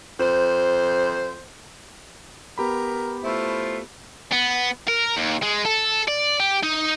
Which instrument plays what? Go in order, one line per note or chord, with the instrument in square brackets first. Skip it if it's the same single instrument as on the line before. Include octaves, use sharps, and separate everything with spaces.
[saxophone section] F2 C5
[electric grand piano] B3 G4 B5 [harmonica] A#4
[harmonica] A3 E4 F4 [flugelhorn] C5
[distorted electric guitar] B3
A#4
D#2
G#3
A4
D5
G4
D#4